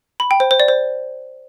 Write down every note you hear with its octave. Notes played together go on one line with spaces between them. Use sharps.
B5
G5
C5
C5
D5
C5